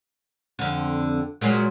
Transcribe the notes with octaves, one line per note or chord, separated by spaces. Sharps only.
F2 D3
A#2 F#3 G#3